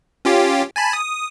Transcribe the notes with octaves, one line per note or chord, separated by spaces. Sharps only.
C#4 F4 G4
G#5 A5 B5
D#6